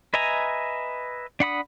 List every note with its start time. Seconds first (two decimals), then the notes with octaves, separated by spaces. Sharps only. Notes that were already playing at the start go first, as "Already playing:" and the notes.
0.14 B4 D#5 E5 G#5 A#5
1.40 D4 F#5 B5 D#6